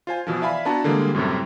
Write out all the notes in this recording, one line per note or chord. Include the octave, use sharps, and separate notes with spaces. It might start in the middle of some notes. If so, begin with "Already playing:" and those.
F4 C5 G#5
B2 E3 F3
D5 E5 F5 G#5 B5
B3 D4 E4 F#4 A5 A#5
D3 E3 G3 G#3 A#3
F#2 A2 C3 G3